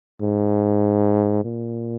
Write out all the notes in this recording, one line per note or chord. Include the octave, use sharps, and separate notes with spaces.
G#2
A#2